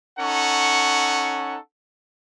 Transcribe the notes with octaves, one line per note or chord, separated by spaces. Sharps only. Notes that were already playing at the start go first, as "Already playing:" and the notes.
C#4 D#4 A4 F#5 C#6